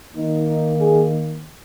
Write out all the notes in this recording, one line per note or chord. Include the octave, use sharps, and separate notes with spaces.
D#3 A#3 D#4
D#4
G#4